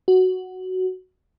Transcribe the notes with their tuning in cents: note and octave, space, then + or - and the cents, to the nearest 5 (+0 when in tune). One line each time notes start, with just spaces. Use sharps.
F#4 +5